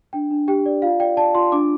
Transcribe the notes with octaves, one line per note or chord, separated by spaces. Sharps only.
D4 G5
D4
G4 G5
D5
F4 F5
D5 G5
D5 A5
F4 C6
D4 D6